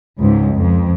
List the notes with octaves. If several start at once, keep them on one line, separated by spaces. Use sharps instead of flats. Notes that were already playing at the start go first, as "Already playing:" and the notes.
C#2 G#2
F2